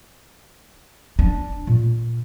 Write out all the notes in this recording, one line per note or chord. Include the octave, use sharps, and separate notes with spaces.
D4
A#2